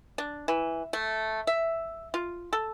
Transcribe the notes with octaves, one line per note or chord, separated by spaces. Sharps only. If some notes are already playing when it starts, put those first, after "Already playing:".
D4
E3
A3
E5
F4
A4